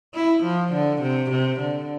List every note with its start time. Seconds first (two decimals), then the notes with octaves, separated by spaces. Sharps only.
0.14 E4
0.44 F3
0.73 D3
1.02 C3
1.31 C3
1.60 D3